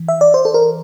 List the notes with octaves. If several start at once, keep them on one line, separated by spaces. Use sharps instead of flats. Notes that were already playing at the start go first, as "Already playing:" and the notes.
Already playing: E3
E5
D5
C5
A4
A#4